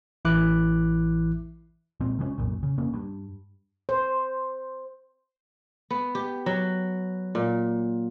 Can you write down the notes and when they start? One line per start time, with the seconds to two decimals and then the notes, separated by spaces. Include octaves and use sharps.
0.25 A1 E3 E4 D6 F#6
2.00 A#2 G#3 C4
2.19 C3 G#3 B3 C#4
2.38 B1 F#2 A#2
2.63 C#3
2.78 G2 B2 A#3 C#4
2.94 G2
3.89 C5
5.90 B3
6.15 G4
6.46 F#3
7.35 A#2